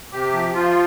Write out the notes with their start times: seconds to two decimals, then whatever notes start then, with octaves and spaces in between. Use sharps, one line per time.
0.12 C3 G4
0.33 F3
0.54 F3 F4